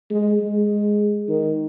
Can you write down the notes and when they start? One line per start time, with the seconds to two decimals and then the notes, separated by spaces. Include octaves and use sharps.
0.11 G#3
0.40 G#3
1.29 D#3